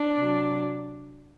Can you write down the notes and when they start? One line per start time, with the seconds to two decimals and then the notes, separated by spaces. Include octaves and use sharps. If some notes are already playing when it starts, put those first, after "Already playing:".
Already playing: D4
0.16 C3 F#3